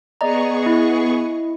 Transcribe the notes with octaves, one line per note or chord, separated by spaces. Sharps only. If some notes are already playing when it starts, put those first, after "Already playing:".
B3 G#4 D5 D#5 A#5 C#6
E4 D#5